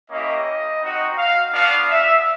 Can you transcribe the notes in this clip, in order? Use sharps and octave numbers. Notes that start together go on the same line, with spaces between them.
A#3 C#4 E4 G4 D#5
C4 D#4 F#4
F5
B3 D4 F#4 F5
E5